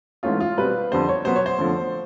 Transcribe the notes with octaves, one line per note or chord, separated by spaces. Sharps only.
G#2 E3 A3 C#4 F4
F4
B2 G3 C4 B4
F2 D3 G3 C5
C#5
B2 F#3 B3 C5
C#5
C5
F2 D3 F3 A3